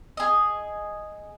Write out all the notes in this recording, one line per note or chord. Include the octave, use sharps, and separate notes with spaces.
G#4 D#5